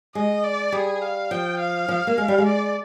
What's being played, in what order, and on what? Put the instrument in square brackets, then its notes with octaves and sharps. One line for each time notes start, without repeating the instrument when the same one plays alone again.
[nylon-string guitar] G#3 [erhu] D#5
[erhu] D5
[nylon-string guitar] G3 [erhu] G#4
[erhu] F5
[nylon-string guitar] F3 [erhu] G5
[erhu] F5
[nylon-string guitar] F3
A#3
G#3
G3
G#3
[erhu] D5